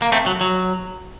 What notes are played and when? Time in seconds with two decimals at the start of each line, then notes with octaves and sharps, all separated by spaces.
0.02 A#3
0.12 A3 C4
0.26 F#3
0.41 F#3